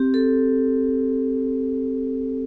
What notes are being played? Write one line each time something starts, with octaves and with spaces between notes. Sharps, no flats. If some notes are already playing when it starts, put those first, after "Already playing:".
Already playing: C4 G4
A4